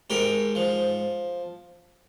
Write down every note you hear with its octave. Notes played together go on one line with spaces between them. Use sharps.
G#2 G4 A#4
F3